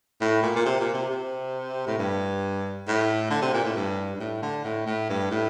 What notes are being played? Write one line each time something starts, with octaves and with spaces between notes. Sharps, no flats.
A2
A#2
A#2
C3
A#2
C3
C3
A2
G2
A2
D3
C3
A#2
A2
G2
G2
A2
D3
A2
A2
G2
A2